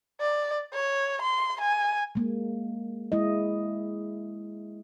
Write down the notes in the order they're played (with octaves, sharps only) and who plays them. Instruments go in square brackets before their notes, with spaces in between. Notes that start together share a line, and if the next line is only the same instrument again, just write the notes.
[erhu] D5
C#5
C6
G#5
[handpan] G#3 A#3
G#3 E4 D#5